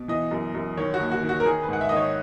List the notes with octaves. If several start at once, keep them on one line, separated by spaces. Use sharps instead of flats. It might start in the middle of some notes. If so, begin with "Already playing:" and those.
Already playing: B2
E3 D#5
F#2
F#2
D#3 C#5
F#4
D#2
F#4
D#3
F#4
A#4
D#3 G#4
B4
G#2 F#5
E5
D#5
D#3 C#5